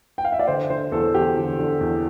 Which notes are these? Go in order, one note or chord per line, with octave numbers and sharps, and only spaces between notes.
G5
F5
E5
D5
D3 C5
D3 C5
E2 A4
E2 G4
D3
D3
E2